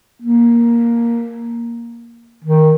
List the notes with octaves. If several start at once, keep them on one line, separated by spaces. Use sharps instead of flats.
A#3
D#3